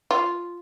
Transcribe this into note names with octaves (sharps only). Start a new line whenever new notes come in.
F4